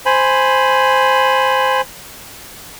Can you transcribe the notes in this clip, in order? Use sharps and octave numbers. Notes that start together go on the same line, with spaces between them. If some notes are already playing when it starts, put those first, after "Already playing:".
C5 G#5 B5